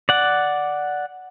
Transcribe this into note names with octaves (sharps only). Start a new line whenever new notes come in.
D5 F#5